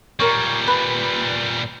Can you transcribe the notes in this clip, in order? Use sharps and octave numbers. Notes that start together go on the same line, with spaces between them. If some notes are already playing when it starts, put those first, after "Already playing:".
A#2 G3 A#4 C#5
B4